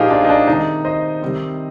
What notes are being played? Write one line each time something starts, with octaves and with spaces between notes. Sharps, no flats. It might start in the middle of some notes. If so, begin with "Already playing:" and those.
Already playing: A#2 F3 A#3 D#4 F4 G4 G#4
D4 F4
D#4
D4
C3 D#3 G#3 D#4
C5 D#5
C3 D#3 G3 C4